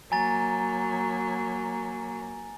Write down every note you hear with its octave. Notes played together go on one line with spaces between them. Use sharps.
F#3 A#3 G#5 A#5 A6